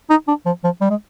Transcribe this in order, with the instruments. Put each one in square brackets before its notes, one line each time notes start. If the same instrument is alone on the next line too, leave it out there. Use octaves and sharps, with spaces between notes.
[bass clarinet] D#4
D4
F3
F3
G3
G#3